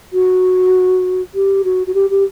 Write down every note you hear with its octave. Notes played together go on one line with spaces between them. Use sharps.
F#4
G4
F#4
F#4
G4
G4